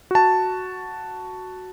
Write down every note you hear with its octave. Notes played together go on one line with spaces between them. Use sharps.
F#4 A5